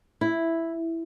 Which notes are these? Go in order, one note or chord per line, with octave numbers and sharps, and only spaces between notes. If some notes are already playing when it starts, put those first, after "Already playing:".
E4